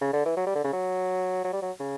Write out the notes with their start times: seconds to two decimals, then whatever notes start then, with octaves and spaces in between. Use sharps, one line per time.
0.01 C#3
0.13 D3
0.25 E3
0.37 F#3
0.46 G3
0.55 D3
0.64 C#3
0.73 F#3
1.44 F#3
1.53 G3
1.62 F#3
1.80 C#3